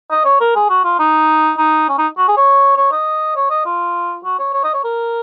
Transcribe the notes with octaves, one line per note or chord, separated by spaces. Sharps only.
D#5
C#5
A#4
G#4
F#4
F4
D#4
D#4
C#4
D#4
F#4
G#4
C#5
C#5
D#5
C#5
D#5
F4
F#4
C#5
C#5
D#5
C#5
A#4